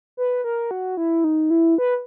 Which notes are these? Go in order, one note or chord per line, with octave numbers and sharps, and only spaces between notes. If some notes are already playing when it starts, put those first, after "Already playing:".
B4
A#4
F#4
E4
D#4
E4
B4